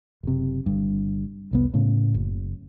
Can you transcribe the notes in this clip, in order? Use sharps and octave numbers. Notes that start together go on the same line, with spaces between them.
F#1 C3
G1 G2
F1 C2 B3
A2 C#3
F#1